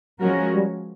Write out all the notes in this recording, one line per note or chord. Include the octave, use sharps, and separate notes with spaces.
F3 F#3 G#3 C#4 F#4 A#4
G3